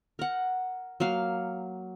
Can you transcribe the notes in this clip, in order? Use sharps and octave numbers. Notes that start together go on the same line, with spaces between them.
A#4 F#5
F#3 A#3 F5